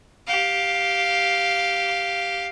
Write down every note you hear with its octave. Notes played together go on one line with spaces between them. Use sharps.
G4 F5